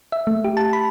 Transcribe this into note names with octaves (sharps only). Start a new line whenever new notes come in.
E5
A3
G4
A5
B5